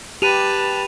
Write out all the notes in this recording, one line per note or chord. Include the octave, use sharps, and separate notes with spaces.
G4 B4 A5 D#7 F7